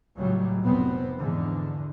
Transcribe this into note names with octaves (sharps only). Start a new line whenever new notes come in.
C#2 A2 F#3 G3
F1 C3 B3 C4
E2 G#2 D3